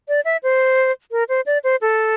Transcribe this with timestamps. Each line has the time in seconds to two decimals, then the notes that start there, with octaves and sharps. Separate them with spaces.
0.08 D5
0.25 E5
0.43 C5
1.12 A#4
1.29 C5
1.46 D5
1.64 C5
1.81 A4